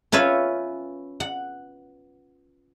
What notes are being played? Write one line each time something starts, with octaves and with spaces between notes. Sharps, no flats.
C#4 F4 B4 C#5 E5
F#5